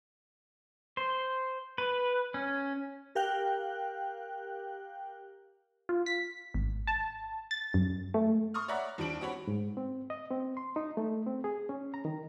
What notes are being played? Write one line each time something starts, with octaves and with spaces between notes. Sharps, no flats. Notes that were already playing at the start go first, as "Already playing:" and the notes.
C5
B4
C#4
G4 A#4 F5 G5 F#6
F4
B6
G#1
A5
A6
F#2
A3
C6 C#6 D#6 F6
C#5 D5 E5 F#5 A#5 B5
D#2 F3 G3 D4 D7 F#7
C4 F#4 C#5 B5
G#2
C4
D#5
C4
C6
D#4
A3
C4
G#4
C#4
A#5
D#3